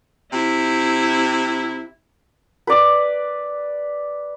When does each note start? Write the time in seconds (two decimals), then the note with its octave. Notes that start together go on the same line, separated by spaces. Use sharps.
0.32 C3 E4
2.67 B4 D5